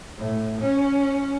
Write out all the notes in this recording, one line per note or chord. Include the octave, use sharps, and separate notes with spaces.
A2
C#4